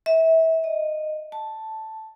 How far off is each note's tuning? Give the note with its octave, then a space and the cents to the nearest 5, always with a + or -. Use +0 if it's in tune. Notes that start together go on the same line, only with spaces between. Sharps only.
E5 -25
D#5 -15
A5 +0